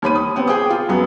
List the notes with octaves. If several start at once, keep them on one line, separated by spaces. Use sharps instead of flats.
D#2 C#5 B5 D#7
D#6
B3 C4
G#4 G5 D6 D#6
F4
F#2 F#3 B3